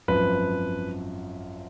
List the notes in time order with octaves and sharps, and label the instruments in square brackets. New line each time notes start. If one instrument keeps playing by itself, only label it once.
[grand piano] G#1 F#2 F3 B4